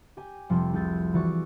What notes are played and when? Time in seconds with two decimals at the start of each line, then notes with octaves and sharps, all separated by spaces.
0.17 G4 G#5
0.49 F1 F3 G3 C6
0.73 C2 G#4 G6 A6
1.14 E3 F#4 D5 C#6